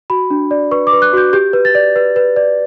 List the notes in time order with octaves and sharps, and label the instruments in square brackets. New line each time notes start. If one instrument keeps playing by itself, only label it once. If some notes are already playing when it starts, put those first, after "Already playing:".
[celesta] F#4 B5
D4
D5
B4 C#6
D6
B4
F#6
F#4 G6
G4 G6
B4
A6
D5
B4
B4
D5